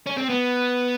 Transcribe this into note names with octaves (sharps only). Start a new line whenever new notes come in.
C#4
C4
B3